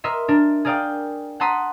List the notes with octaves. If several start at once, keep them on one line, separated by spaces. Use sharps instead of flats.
A#4 D#5 E5 C6
D4 A#4
G#4 A#4 D5 F5 G5 D#6
F#5 A5 A#5 C6 D#6 B6